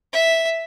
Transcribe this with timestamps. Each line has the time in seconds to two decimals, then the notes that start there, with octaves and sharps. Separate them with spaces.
0.13 E5